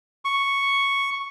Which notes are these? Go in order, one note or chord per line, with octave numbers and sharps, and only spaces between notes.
C#6